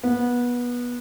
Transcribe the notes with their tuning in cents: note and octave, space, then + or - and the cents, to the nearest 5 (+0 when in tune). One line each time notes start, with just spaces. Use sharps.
B3 -20